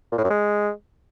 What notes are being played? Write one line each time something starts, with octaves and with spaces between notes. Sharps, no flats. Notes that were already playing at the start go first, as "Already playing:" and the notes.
A#2
A2
F#2
G#3